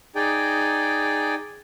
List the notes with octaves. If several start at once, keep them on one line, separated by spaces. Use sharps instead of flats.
D#4 G#4 D5 G5